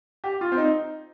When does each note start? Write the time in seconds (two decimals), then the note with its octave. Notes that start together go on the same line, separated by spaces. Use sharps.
0.24 G4
0.41 F4
0.52 C4
0.57 D#4